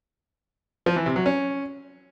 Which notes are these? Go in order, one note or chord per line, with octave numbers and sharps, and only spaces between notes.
F3
E3
C3
F#3
C#4